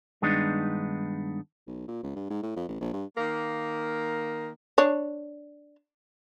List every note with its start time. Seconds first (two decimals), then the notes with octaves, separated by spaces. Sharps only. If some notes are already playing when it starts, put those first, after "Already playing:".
0.22 G2 D#3 G#3 B3 D4 D#4
1.67 B1
1.88 A#2
2.03 C#2
2.16 G2
2.30 G#2
2.42 A2
2.56 F2
2.68 A1
2.80 A#1
2.93 G2
3.18 D#3 A#3
4.78 D4 C#5